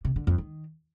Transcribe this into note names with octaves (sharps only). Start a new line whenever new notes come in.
C3
D3
F2
D#3